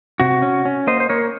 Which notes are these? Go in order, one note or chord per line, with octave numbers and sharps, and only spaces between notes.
C3 F#4
C#4
C#4
A#3 C5 D#5
C5
A#3 A#4 C#5